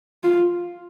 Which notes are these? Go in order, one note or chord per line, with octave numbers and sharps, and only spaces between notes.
F4